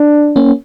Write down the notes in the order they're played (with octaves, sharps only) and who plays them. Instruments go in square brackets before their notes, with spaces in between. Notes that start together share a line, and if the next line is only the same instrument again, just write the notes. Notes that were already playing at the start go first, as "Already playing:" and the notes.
Already playing: [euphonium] D4
[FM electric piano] A#3 C#4